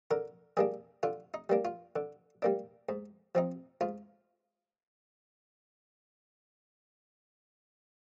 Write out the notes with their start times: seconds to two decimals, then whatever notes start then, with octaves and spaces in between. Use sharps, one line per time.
0.11 D3 A#4
0.57 G3 A#3 D4 G#4
1.03 D3 F4
1.34 D#4
1.49 G3 A#3 D4
1.65 F4
1.96 D3
2.42 G3 A#3 D4
2.89 G#2
3.35 F3 C4 D#4
3.81 G#2 F4